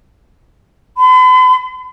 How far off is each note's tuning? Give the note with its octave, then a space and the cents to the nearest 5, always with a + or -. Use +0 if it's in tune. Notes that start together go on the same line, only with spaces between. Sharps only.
B5 +45